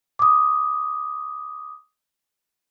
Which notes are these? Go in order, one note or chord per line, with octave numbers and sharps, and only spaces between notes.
D6 D#6